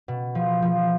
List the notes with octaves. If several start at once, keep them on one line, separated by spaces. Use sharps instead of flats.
B2
F3
F3